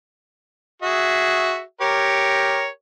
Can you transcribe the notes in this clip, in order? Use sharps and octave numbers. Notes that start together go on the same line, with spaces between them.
F#4 G#4 E5
G4 A#4 C#5